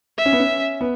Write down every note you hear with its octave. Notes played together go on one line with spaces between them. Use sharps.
E5
C#4
B3
C#4
B3